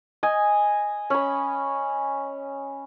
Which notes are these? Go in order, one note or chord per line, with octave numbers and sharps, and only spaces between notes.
D#5 G#5
C#4 B5